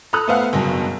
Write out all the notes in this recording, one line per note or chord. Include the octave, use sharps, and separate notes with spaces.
A4 A#5 B5 D#6 E6 F#6
A3 B3 B4 C5 F5 F#5
F#1 G2 B2